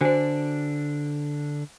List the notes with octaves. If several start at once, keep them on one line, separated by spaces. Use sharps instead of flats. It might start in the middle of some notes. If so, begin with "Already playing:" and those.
D3 D4 F#4 C5 G#5